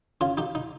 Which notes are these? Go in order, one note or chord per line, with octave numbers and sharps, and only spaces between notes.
C#3 F4
D#4 G4
D#4